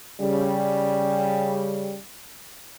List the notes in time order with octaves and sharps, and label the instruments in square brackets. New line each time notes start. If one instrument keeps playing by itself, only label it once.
[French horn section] C#3 G3